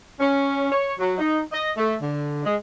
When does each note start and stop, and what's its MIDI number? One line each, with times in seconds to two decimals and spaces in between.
0.19 0.71 61
0.71 0.93 73
0.99 1.13 54
1.18 1.40 63
1.53 1.70 75
1.77 1.94 57
2.01 2.44 50
2.44 2.54 56